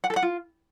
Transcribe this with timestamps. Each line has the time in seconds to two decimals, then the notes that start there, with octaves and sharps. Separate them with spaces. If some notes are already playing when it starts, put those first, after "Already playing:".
0.04 F#5
0.10 A4
0.16 F#5
0.23 F4